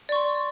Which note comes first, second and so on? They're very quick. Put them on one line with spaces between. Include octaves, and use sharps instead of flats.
D5 C#6 C6